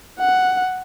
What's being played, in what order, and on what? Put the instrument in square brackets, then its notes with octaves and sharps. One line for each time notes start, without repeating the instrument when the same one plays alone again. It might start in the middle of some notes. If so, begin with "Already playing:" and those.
[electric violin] F#5